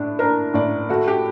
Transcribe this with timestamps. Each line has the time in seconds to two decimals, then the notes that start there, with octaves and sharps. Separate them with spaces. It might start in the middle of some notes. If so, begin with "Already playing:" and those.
Already playing: A2 D4
0.19 D4 A#4
0.54 A2 D5
0.89 A3 F#4
1.08 G4